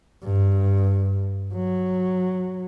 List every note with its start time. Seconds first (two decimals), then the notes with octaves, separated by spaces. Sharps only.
0.24 G2
1.55 F#3